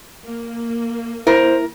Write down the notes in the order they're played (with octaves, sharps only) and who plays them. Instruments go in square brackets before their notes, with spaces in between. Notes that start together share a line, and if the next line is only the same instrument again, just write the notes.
[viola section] A#3
[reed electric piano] E4 [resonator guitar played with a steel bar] A#4 [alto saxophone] C5